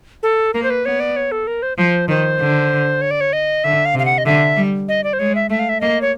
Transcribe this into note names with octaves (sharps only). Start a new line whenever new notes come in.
A4
A#3 A#4
C5
B4
B3 C#5
D5
C#5
A4
A#4
C5
F3 C5
D#3 C5
D3
C#5
D5
C#5
D#5
D3 E5
F5
C3
F5
F#5
D#5
D3 E5
G3
D#5
D5
C5
G#3 C#5
E5
A3 E5
F5
E5
A#3 D#5
C#5